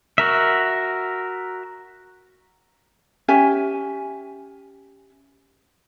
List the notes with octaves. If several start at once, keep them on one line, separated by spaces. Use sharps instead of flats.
F#4 A#4 E5
C#4 G4 E5 G#5